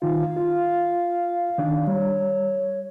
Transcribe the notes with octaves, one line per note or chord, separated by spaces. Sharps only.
D#3 D#4 F4 F5
F4
D#3 D4
G3 C#5